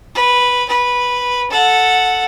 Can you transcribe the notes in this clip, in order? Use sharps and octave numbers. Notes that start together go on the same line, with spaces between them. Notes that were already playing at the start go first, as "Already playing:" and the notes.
B4
B4
A4 F#5